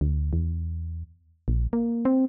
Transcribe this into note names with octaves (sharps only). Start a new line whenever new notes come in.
D2
E2
A#1
A#3
C4